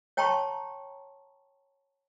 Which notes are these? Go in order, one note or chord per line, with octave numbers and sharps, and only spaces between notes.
C#5 G5 A5 A#5 C6 C#6